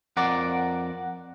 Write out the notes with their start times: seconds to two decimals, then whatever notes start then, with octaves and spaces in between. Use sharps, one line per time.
0.17 F2 A#4 D5 F#5